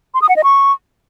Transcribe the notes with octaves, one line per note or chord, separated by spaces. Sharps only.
C6
D#6
F#5
D#5
C#6